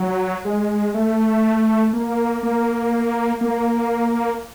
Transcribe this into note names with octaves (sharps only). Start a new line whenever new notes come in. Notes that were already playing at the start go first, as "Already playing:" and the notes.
Already playing: F#3
G#3
A3
A#3
A#3
A#3